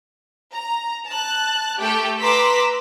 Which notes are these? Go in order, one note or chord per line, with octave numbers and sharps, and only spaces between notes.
A#5
A5 F#6
A3 G4 A4 G5
B4 A#5 C6 D6 E6 B6